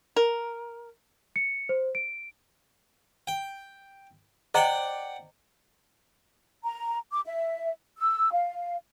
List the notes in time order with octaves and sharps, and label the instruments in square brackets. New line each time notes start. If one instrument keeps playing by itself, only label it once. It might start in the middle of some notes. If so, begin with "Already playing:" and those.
[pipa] A#4
[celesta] C#7
C5
D7
[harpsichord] G5
[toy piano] C5 D#5 A#5 [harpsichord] D5 F#5 G5
[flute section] A#5
D6
E5
E6
F5